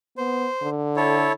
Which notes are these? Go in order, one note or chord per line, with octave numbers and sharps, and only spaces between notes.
B3 C5
D3
E4 A4 C#5